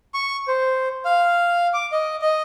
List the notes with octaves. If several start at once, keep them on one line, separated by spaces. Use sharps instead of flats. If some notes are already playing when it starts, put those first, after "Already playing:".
C#6
C5
F5
D6
D#5
D#5